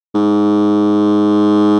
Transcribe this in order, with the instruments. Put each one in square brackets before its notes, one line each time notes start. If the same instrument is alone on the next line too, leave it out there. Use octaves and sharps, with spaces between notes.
[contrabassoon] G#2